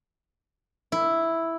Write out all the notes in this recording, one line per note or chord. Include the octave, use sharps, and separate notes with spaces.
E4